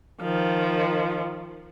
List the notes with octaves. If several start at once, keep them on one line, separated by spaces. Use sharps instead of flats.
D#3 F3